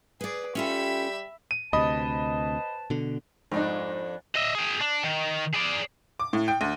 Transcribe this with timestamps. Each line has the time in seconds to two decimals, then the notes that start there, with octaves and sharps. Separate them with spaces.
0.21 G#4 B4 D5
0.55 G3 C#4 F4 G4 A4 E5 B5
1.51 D#7
1.73 D2 C3 B4 C5 D#5 A5 B5 D#6
2.90 B2 D3
3.52 F2 G#2 D4 D#4
4.35 D#5 E5
4.55 G#4 G5
4.81 D4
5.04 D#3
5.55 G#4 D5
6.20 D6
6.33 A2
6.48 G5
6.61 D2